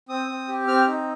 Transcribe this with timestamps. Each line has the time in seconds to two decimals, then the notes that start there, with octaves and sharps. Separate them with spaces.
0.09 C4 D#6
0.28 C4
0.48 G4
0.67 C4 F6
0.87 D#4